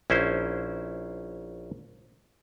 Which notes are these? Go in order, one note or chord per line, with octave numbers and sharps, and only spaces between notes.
A#1 C#4 E4 C5